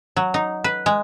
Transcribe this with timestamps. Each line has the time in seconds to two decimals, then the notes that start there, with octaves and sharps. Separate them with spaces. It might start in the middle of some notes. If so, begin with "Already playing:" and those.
0.16 F#3
0.34 D#4
0.64 B4
0.86 G#3